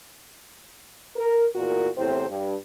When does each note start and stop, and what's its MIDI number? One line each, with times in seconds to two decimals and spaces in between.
1.15 1.45 70
1.54 1.87 40
1.54 1.87 46
1.54 1.87 66
1.54 1.87 70
1.97 2.26 40
1.97 2.26 45
1.97 2.26 48
1.97 2.26 60
1.97 2.26 72
2.29 2.55 43